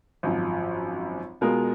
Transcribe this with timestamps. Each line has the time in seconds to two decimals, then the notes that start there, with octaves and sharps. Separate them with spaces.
0.23 G#1 F#2 F3
1.41 B2 G#3 B3 F4 A#4